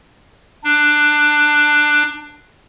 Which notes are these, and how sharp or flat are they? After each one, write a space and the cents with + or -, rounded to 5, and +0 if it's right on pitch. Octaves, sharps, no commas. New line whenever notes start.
D4 +15